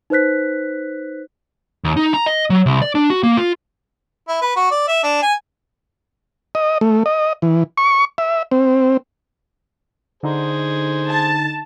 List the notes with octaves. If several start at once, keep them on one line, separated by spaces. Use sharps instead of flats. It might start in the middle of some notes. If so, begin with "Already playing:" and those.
D#4 B4 C5 F#6 B6
D#2
D#4
A#5
D#5
F#3
C2
D5
D4
F#4
A#3
F4
E4
B4
F#4
D5
E5
D4
G#5
D#5
A3
D#5
E3
C#6
E5
C4
D3 D#4 G#4 C5
A5